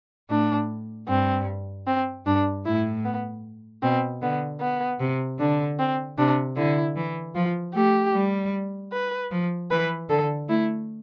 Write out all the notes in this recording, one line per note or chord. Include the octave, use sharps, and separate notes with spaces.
A2 D4
G2 C4
C4
G2 D4
A2 E4
B3
B2 C4
D3 B3
B3
C3
D3 D4
C4
C3 D4
D3 E4
E3
F3 F4
A3 G4
G3
B4
F3
E3 B4
D3 A4
A3 E4